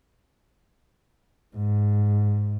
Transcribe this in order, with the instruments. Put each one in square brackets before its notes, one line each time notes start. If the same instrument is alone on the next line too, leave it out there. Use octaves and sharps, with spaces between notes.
[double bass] G#2